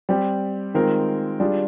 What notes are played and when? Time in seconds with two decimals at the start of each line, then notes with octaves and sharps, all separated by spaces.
0.09 G3 C4 G4
0.74 D#3 G#3 C4 F4 A#4
1.40 G3 D4 F4 G#4